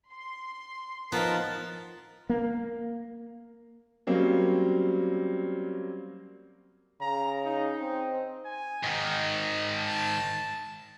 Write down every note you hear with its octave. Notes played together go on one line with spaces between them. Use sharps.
C6
F3 B3 D#4 A#4 A5
A#3
F#3 G3 A#3 C4 C#4
C#3 A#5
D#4
C4
G#5
G#2 D#3 D#5
A5